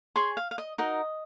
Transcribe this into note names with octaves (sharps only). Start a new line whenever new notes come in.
G#4 C#5 G#5 C6
F5
F5
D#5
D#4 F#4 A#4 D#5